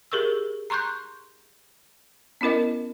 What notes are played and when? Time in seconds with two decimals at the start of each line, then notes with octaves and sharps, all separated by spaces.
0.12 G4 G#4 A#4 C#6 E6
0.70 A#5 C6 C#6 F#6 G6
2.41 B3 C#4 E4 A#4 D#5